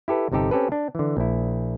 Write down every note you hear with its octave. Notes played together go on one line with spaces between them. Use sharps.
E4 G4 A4 B4
G1 C3 D#4 G4 A4
C4 C#4 G4 A4 B4
D4
D3 E3
A#1 E4